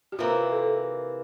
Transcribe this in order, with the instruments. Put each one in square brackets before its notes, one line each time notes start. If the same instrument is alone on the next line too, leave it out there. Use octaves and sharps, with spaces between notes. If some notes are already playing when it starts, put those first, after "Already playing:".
[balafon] G4
[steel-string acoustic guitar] C3 E3 A#3 [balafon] F4
[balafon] A4